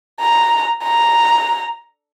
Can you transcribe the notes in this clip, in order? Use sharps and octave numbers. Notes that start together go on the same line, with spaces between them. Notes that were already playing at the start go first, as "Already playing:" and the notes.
A#5
A#5